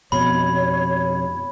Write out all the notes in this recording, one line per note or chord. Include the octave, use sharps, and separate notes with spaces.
F2 B2 C#5 B5